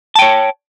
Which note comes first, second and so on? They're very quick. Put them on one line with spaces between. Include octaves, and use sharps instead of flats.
A5 G5 C#5